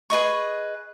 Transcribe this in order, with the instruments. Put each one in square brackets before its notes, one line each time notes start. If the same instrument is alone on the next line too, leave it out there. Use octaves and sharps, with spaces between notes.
[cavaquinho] G#4 B4 D#5 C#6